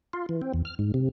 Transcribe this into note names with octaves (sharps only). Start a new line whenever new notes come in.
F4
E3
C4
E2
F6
G#2
C3